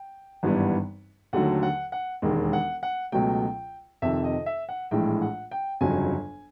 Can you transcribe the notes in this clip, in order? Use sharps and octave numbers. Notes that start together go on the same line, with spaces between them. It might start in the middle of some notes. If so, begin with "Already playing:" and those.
Already playing: G5
G#1 G2 E3 G3 B3
D#2 D3 F#3 A3 F#5
F#5
F#5
E1 D#2 D#3 G#3
F#5
F#5
C#2 B2 F#3 A3 G5
F2 C3 D#3 E5
D#5
E5
F#5
A#1 A2 E3 G#3 G5
F#5
G5
G1 F2 C#3 F#3 G#5